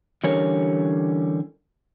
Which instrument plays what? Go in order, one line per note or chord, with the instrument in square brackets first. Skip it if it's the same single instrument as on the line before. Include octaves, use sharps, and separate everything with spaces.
[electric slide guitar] D3 E3 G3 C#4 A#4 C#5